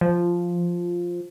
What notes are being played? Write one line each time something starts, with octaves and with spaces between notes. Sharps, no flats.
F3